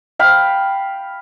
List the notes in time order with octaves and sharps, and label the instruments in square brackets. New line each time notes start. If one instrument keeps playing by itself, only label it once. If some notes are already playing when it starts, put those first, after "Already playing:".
[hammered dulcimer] F5 G5 B5